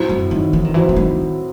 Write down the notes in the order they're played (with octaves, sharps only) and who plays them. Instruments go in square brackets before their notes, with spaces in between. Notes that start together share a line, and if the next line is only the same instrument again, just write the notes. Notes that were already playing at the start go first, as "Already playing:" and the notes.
Already playing: [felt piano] A2 F#3 C4
[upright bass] F#2
D#3
E3
D#3
[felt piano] A2 F#3 C4 [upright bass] E3
[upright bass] E3
D#3